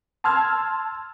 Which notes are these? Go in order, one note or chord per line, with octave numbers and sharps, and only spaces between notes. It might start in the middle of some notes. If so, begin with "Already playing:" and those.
A5 C6 E6 F6 G#6